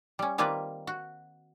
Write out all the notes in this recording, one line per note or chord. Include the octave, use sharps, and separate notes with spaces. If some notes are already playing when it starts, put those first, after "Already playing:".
G3 C#4
D#3 G3 A#3 C4 F4 B4
F#4